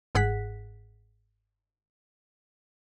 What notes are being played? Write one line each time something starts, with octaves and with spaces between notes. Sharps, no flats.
G1 G#2 G#4 F#5 F#6 B6